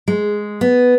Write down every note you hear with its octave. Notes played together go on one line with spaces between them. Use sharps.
G#3
B3